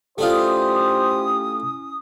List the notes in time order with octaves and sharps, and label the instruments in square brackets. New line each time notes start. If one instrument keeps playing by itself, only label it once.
[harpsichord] A3 D4 F4 [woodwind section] C#4 E4 D#6 [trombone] G4 [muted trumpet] C5